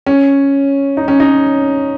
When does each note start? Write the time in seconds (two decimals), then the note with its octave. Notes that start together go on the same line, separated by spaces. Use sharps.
0.06 C#4
0.97 D#4
1.08 C#4
1.20 D#4